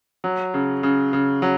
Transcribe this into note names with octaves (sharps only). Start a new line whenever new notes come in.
F#3
C#3
C#3
C#3
F#3